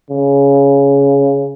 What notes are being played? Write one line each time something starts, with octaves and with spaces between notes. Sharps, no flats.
C#3